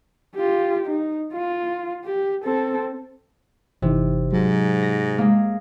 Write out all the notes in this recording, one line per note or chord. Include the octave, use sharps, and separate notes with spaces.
F4 G4
D#4
F4
G4
C4 A4
G1 C3 E3 D#4
G#2 F#3
A#6
G#3 A#3